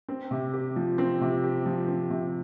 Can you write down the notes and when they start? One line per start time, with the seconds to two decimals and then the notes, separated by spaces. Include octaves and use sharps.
0.09 C4
0.31 C3
0.54 G4
0.76 F3
0.98 C4
1.21 C3
1.44 G4
1.66 F3
1.88 C4
2.10 C3